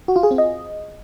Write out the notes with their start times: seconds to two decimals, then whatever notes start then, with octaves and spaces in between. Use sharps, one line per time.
0.08 F#4
0.16 F4
0.23 G#4
0.31 C4
0.38 D#5